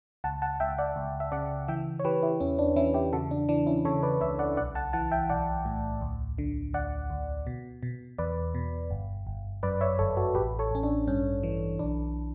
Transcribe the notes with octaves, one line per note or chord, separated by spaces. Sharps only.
C#2 F#5 A5
F#5 A5
C#2 E5 G5
D5 F#5
C#2
E5
C#3 D5 F#5
E3 E5 G5
C#5
E3 G4 B4
E4 G4
E2 C#4
D4
E3 C#4 E4
E4 G4
C#3 F#4 A4
D4
E3 D4
C#4 E4
C#3 A4 C#5
B4 D5
C#2 C#5 E5
D5 F#5
B1 D5 F#5
F#5 A5
E3 F#5 A5
E5 G5
B1 D5 F#5
A2
D2
D3
D2 D5 F#5
D2
B2
B2
E2 B4 D5
B2
G1
G1
F#2 B4 D5
C#5 E5
G1 A4 C#5
F#4 A4
A1 G4 B4
A4 C#5
A1 C#4
D4
G2 C#4
E3
B1 D4